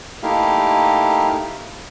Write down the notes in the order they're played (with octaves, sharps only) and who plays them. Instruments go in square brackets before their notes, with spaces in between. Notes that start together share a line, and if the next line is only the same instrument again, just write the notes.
[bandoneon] A3 A#3 D#4 E4 G4 F5